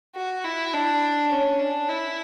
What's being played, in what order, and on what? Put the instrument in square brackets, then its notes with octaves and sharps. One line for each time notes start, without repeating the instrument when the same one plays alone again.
[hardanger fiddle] F#4
E4
D4
C#4
D4
E4